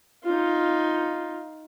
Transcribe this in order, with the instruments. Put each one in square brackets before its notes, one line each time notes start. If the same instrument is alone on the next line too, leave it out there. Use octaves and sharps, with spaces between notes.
[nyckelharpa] D#4 F4